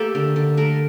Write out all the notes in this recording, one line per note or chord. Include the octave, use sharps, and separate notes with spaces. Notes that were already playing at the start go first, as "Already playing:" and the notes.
Already playing: A3 A#3 G4 A4
D3
D3
A3 A#4